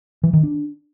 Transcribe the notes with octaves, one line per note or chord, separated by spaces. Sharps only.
E3
D#3
D4